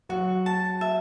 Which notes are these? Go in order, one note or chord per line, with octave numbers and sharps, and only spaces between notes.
F#3 F#4
A5
E5